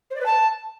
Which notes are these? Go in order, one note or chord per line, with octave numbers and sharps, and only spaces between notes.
C5
D5
B4
A5